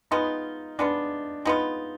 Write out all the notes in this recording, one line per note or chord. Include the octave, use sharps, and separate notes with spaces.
G#3 B3 D#4 F4
G#3 B3 D4 F4
G#3 B3 D#4 F4